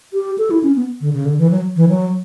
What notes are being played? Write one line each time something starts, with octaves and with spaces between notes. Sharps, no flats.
G4
A4
E4
C#4
B3
D3
C#3
D3
E3
F#3
E3
F#3